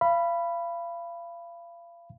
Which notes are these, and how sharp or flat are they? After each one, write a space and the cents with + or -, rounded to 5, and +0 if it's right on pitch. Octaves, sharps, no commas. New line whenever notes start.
F5 -35 B5 +0